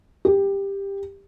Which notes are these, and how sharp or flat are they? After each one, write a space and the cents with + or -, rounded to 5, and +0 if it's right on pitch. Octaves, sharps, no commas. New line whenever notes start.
G4 +15